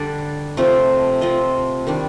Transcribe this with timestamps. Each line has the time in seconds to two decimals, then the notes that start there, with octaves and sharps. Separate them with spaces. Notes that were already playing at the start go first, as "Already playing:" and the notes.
Already playing: D3 G3 D4 D5
0.57 C3 F3 A3 C4
1.21 F3 C4 D#5
1.87 D#3 G3 D4